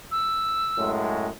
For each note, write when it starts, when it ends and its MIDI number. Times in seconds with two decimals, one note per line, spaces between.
0.11 0.90 88
0.78 1.27 42
0.78 1.27 45
0.78 1.27 56